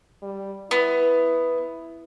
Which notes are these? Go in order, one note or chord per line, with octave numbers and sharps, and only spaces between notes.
G3
B3 E4